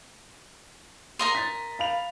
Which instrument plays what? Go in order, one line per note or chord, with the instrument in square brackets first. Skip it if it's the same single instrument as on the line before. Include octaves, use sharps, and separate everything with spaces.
[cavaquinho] A#4 D#5 C6
[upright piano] A6 B6
F5 B5 F7